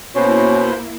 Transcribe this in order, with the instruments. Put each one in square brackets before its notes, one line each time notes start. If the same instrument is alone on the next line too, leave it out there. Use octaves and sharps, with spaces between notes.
[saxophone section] B2 C5 [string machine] A#3 E4 [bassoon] C#4